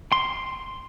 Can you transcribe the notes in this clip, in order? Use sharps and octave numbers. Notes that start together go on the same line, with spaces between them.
C6